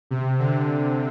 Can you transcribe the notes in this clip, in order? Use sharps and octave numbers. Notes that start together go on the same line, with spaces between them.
C3
D3